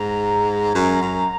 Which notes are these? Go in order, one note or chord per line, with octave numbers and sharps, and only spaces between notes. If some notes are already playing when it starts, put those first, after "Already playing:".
Already playing: G#2 A#5
F#2 A#5
F#2